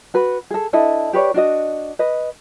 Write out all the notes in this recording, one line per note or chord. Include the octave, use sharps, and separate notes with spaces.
F#4 B4
G#4 A4
D4 E4 A4 D#5
G4 B4 C#5 D5
D4 F#4 D#5
B4 D#5